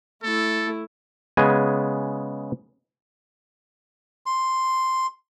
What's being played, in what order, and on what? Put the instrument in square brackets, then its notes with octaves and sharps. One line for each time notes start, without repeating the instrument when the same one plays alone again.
[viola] A3 E4 [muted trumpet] A4
[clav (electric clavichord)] C#3 G#3 B3 G#5
[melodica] C6